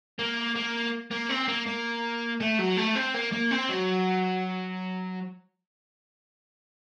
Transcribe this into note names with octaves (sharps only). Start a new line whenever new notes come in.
A#3
A#3
A#3
C4
A#3
A#3
A3
F#3
A3
C4
A#3
A#3
C4
F#3